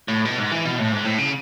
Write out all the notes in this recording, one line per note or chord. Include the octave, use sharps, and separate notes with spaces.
A2
B2
G#2
E3
B2
A2
G#2
A2
C#3